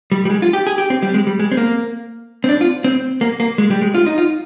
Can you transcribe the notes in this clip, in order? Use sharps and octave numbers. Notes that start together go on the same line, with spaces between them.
G3
G3
G#3
F4
G4
G#4
G4
C4
G3
G#3
G3
G#3
C4
A#3
C4
D4
F4
C4
A#3
A#3
G#3
G3
G#3
F4
D#4
F4